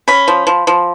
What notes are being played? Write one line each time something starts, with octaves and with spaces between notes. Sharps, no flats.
C#4 B5
F3
F3
F3